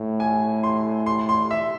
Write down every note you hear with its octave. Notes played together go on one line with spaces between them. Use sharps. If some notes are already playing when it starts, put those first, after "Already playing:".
Already playing: A2
G#5
C6
C6
C6
E5